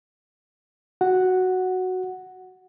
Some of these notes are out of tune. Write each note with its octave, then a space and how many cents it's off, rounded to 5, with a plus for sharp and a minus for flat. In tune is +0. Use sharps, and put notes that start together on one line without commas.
F#4 +0 F#5 +0